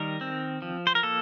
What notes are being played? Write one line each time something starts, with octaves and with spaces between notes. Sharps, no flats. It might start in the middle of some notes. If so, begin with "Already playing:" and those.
Already playing: D#3 G3 A#4
C4
F3
C5
A#4
A#3 A4